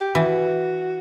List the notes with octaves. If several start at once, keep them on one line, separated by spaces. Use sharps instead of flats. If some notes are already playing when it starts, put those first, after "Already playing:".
G4
E3 F#4